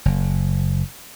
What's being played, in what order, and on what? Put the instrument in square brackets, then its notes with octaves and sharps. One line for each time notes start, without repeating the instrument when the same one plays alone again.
[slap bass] F#1